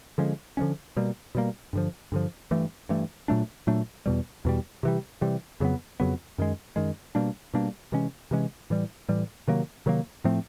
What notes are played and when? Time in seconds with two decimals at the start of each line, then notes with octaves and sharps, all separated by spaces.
0.18 D3 F3 G#3 C#4
0.57 D3 F3 G#3 C#4
0.96 B2 G3 A#3
1.35 B2 G3 A#3
1.73 G2 D3 F3
2.12 G2 D3 F3
2.51 G2 E3 A3
2.89 G2 E3 A3
3.28 A#2 F#3 A3 D4
3.67 A#2 F#3 A3 D4
4.06 E2 B2 G3
4.45 E2 B2 G3
4.83 C3 E3 G3
5.21 C3 E3 G3
5.60 F2 C#3 F#3 B3
6.00 F2 C#3 F#3 B3
6.38 F#2 D#3 G#3
6.76 F#2 D#3 G#3
7.15 B2 G3 A#3 D4
7.54 B2 G3 A#3 D4
7.92 C3 E3 G#3 C#4
8.31 C3 E3 G#3 C#4
8.70 A2 E3 G3
9.08 A2 E3 G3
9.48 C3 D#3 F#3 A#3
9.86 C3 D#3 F#3 A#3
10.24 A2 F3 A3 C4